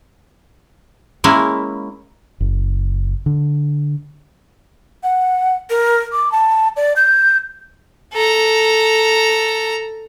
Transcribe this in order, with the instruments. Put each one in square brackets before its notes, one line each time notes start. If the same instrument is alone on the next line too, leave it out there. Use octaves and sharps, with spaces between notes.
[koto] G#3 A#3 C#4 E4
[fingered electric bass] F#1
D3
[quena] F#5
A#4
D6
A5
D5
G6
[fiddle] A4 A#5